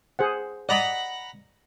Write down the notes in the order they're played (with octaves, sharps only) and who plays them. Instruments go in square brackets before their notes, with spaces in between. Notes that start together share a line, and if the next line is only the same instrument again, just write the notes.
[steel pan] G#4 C5 F#5
[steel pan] D5 D#5 [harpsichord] F#5 A#5 B5